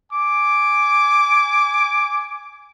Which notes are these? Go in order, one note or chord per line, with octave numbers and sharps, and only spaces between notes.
G#5 D6